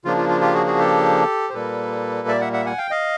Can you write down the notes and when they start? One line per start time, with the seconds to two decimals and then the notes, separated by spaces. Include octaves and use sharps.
0.05 C#3 F3 A#3 D4 F4
0.17 F4
0.29 F4
0.41 F4 G4
0.54 F#4 G#4
0.66 F#4 G#4
0.78 G4 A4
1.50 C5
1.54 A#2 G3 A#3 A4 B4
2.28 D5 E5
2.41 E5 F#5
2.53 E5 F#5
2.65 F#5 G#5
2.78 F5 G5
2.90 D#5 F5